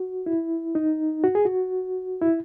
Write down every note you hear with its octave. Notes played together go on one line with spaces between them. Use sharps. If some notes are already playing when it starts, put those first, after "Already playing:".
Already playing: F#4
E4
D#4
F#4
G#4
F#4
E4